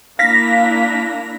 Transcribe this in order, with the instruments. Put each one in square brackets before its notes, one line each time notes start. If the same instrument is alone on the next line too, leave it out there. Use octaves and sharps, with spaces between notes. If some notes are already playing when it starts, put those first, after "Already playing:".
[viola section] A#3 D4 E4 [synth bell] F5 A#6 B6